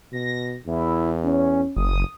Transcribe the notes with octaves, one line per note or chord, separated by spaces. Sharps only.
B2 A#6
E2 E4
C#4
F#1 D#6